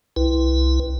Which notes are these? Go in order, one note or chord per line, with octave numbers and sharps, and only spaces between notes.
C2 E4 B4